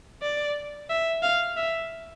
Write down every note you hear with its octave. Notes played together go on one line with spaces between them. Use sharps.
D5
E5
F5
E5